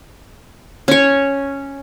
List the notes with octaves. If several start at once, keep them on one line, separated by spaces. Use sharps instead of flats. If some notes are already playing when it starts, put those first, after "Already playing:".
C#4 C#5